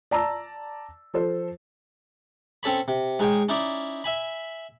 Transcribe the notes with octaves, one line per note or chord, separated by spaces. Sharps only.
D5 A5 A#5 E6
F3 A4 C5
C4 C#4 A4 C#5 B5
C3
G#3 D#4 G#4 C#5 G5 G#5
C#4 D#4 E4 D5
E5 G#5 B5